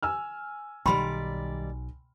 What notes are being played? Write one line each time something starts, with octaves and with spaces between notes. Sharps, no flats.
G#5 E6 F6
B1 D#3 G3 D5 G5 B5 C6